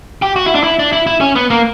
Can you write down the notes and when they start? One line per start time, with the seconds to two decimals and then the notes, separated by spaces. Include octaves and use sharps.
0.22 G4
0.36 F#4
0.46 E4
0.55 D4
0.64 E4
0.79 D4
0.93 E4
1.07 E4
1.21 C#4
1.36 B3
1.50 A#3